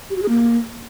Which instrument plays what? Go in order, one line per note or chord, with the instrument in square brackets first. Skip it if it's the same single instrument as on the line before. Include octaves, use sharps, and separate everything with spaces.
[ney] G4
F#4
G#4
A#3